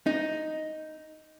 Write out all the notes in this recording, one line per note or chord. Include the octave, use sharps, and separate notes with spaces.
D#4